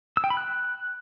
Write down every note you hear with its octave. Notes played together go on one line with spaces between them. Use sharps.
E6
G5
B5
F#6